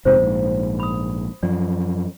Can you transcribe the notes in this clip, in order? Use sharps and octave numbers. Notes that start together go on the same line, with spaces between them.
F1 G#2 C3 F4 C5
A#1 G#2
B5 D#6
F#2 F3 D5